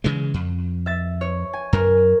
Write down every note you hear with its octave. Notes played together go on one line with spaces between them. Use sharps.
C#3 E3 G#3
F2
E5 A6
C#5
G#5
F#2 A#4